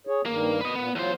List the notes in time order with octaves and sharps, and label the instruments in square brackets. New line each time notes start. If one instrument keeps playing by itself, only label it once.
[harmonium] G#4 C#5
[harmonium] G2 D#3 [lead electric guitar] A#3
[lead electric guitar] B4 D#5
[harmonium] A#2 [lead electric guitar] B3
[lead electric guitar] E2 C5 [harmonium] F#3 F4